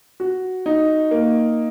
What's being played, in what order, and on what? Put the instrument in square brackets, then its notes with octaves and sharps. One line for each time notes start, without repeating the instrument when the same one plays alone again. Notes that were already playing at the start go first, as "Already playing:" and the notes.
[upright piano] F#4
D#4
A#3